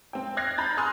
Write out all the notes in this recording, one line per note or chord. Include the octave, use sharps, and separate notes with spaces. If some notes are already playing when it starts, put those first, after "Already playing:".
C4 G5
F6 F#6 G#6 A#6 C7
A#5 B5 G6 A6
G#5 A#5 C6 D#6 F6 F#6